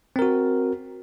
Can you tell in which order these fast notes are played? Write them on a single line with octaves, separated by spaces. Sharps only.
C4 A#4 F#4